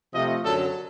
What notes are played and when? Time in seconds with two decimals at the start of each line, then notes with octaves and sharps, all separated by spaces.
0.13 C3 F3 A3 D#5
0.43 F#2 D3 F#3 A4